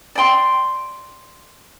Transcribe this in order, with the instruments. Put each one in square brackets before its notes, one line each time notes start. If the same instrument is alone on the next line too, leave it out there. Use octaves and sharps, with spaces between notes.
[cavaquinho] D5 G5 C6